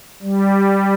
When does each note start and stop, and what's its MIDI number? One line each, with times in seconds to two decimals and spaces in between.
0.23 0.94 55